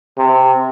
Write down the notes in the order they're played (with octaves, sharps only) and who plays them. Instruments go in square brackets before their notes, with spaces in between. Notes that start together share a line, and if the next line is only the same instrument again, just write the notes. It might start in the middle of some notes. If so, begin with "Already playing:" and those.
[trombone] C3